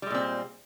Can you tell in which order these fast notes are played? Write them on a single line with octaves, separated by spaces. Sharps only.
G3 G#3 A#2 C4